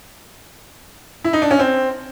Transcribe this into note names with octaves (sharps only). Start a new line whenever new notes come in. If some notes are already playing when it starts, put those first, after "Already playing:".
E4
D#4
D4
C#4
C4